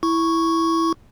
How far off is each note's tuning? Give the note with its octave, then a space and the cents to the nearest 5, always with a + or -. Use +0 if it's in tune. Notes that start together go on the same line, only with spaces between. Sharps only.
E4 +0 C#6 +0